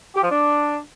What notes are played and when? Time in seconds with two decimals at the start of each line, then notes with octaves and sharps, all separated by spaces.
0.15 G4
0.23 F3
0.30 D4